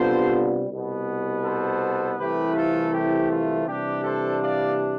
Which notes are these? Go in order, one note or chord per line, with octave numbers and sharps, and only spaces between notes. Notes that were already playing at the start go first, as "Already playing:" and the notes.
Already playing: C3 G3 B3 D4 F4 A4 C5
C2 B2 B3
A4 C5
C2 C3 E3 A3 E4 G4 B4
F4 A4
G4
F4
C3 E3 G3 D4 G4
A4 C5
D5 F5